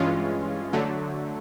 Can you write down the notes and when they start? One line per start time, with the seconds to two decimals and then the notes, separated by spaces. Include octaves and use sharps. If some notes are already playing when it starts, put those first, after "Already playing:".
Already playing: G2 E3 G#3 C#4 F4
0.73 D3 F#3 A3